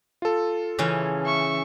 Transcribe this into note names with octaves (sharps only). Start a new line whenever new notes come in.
F4 A4
C#3 E3 C#4
E5 C#6